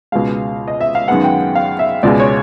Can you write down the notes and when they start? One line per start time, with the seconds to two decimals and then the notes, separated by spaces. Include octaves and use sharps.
0.12 C#2 B2 G#3 F5
0.68 D#5
0.81 E5
0.95 F5
1.08 F#2 D#3 G#3 B3 F#5
1.24 G5
1.55 F5
1.79 E5
2.03 C#2 B2 G#3 D5
2.20 C#5